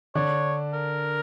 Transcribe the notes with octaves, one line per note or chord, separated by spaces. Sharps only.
D3 D4 C#5
A#4